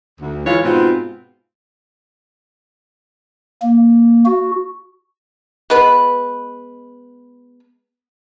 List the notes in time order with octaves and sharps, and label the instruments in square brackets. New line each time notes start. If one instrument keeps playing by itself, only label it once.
[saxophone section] D2
E3 F3 G#3 F4 C#5 F5
G#2 B2 B3 C4 F4
[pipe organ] A#3
F#4
[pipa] G#3 B3 B4